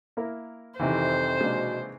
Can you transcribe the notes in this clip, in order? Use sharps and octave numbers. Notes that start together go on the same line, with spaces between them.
A#3 E4 A#4
F2 C3 D#3 E3 C5
B2 G#3 A#3 D4